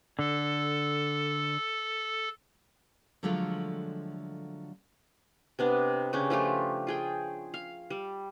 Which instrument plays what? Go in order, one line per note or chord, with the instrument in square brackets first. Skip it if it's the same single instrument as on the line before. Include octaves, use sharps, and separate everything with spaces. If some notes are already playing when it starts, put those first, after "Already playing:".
[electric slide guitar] D3 [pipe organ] A4
[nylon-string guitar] D3 F3 F#3 G#3 A3 F4
[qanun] C3 B3 D4
C#3 C#4 D4 G4
F3 A3 F4 G4
F4 G#4 G5
F5
G3